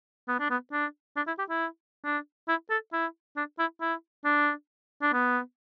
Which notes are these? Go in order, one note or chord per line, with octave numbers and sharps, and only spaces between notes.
B3
D4
B3
D4
D4
E4
G4
E4
D4
E4
A4
E4
D4
E4
E4
D4
D4
B3